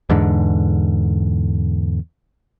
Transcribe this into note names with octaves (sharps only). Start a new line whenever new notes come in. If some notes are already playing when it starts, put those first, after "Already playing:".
E2 G#2 D3